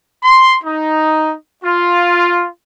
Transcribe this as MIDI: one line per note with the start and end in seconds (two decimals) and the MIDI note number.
0.22 0.55 84
0.64 1.34 63
1.63 2.47 65